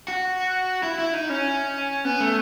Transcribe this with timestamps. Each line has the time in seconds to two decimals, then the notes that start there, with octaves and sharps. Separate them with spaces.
0.08 F#4
0.83 E4
0.98 E4
1.14 D#4
1.29 C#4
2.05 B3
2.20 A3